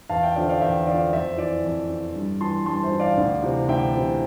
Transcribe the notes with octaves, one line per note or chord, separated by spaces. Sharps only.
E2 F5 A5
E5 G5
D3 F3 D5 F5
D5 F5
E2 E5 G5
D3 F3 D5 F5
F2 C5 E5
E3 D5
F2
E3
G2
E3 A5 C6
G2 A5 C6
C5 E5
E3
D5 F5
D2
C3 E3
D2 E5 G5
C3 E3